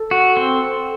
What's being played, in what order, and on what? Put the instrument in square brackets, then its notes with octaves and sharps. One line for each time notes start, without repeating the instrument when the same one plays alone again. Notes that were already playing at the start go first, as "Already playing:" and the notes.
Already playing: [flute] A4
[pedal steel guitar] F#4
C4